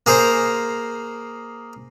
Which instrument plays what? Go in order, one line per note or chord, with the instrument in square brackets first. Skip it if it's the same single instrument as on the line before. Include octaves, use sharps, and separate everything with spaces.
[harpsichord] A#3 G#4 A#4 C5